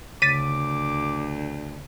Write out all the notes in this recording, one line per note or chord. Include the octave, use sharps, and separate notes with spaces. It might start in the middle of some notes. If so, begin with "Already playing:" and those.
D2 C#3 D6 A6 B6 D#7